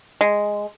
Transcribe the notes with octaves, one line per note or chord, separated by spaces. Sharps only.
G#3